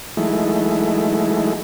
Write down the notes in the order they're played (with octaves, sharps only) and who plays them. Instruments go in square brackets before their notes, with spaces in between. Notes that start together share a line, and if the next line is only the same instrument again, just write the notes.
[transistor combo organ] E3 F#3 G#3 A3 D#4 E4